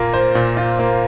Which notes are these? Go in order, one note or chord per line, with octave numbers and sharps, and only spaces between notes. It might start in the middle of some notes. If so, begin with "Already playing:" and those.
Already playing: A#2 A#3 F4
C5
A#2
F4
A#3